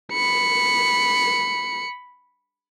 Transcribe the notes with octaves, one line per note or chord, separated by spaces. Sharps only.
B5 C#7